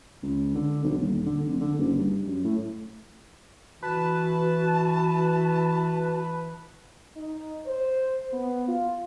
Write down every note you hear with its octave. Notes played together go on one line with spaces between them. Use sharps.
C#2
D3
B1
D#1
D3
F1
D3
F#1
G2
F#2
A2
E3 F#4 B4 A5
D#4
C5
B3
F4